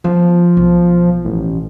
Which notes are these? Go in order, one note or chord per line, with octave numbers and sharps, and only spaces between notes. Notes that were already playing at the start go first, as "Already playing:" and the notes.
F3 B3
B1
A1